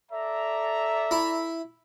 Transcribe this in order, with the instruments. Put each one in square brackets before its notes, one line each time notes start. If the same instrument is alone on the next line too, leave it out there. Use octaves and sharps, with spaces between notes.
[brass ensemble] A4 D5 A#5 [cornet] E5
[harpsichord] E4